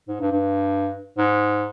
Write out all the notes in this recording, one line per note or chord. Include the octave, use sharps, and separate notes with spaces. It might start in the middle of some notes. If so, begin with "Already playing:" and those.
G#2
G2
G2
G#2